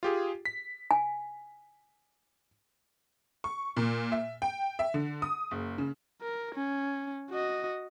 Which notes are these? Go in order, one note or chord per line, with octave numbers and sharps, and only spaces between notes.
F4 G4 G#4
B6
G#5
C#6
A#2
E5
G5
E5
D3
D#6
F#1
C#3
A#4
C#4
F#4 D#5